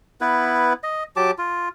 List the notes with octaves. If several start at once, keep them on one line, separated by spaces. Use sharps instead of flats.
B3 E4 B4
D#5
F#3 G4 A5 D6
F4